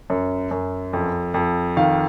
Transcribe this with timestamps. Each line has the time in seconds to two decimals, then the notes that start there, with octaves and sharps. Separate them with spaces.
0.10 F#2
0.51 F#2
0.93 F2
1.34 F2
1.77 D#3 F5